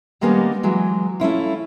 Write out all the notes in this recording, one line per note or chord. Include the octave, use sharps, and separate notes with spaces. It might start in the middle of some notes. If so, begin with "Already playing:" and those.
D#3 G3 G#3 A#3 B3 C#4
E3 F#3 G#3
A3 C#4 E4 F4